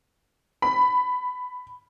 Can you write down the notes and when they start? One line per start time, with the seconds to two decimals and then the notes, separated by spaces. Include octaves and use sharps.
0.62 B5